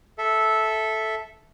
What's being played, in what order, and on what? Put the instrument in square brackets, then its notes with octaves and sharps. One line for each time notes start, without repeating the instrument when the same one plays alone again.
[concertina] A4 E5